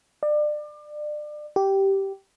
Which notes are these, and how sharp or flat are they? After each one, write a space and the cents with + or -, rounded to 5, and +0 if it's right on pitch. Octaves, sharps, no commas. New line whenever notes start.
D5 +30
G4 -10